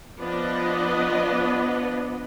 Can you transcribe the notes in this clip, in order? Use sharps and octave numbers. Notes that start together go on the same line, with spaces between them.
F3 B3 D4 B4 D5 D#5